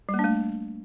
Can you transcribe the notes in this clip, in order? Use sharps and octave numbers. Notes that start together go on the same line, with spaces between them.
G3
A#3
D4
A3